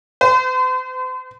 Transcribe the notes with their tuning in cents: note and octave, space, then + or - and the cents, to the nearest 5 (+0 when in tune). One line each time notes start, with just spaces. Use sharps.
C5 -45